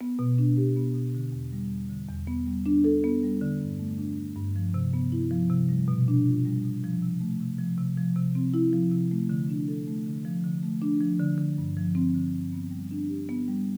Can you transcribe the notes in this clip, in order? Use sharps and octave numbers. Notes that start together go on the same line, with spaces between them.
B3
B2
D4
G4
B3
B2
D3
E2
G3
E2
D3
E2
B3
G3
D4
A4
B3
G3
D3
G2
A3
D4
D3
G2
F3
C3
B3
E4
F3
C3
G3
B2
D4
F4
G3
B2
F3
C3
A3
C3
F3
C3
F3
C3
C4
E4
F3
C3
A3
D3
D4
A4
A3
D3
F3
D3
A3
D4
F3
D3
D3
G2
F3
C4
D3
G2
B3
G3
D4
G4
B3
G3